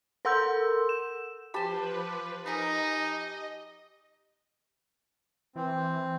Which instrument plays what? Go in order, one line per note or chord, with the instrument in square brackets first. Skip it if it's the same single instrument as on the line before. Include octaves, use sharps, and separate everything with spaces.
[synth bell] A4 A#4 F#5 C6 E6 G6
E7
[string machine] F3 B4 [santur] G4 A5 [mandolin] C5 B5
[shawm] D#4 [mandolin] A#4 G#5 B5 [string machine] D#5
[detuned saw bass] E3 [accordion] C4